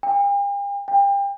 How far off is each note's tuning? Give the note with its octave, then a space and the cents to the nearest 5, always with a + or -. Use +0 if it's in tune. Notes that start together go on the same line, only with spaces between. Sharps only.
G5 +45
G5 +30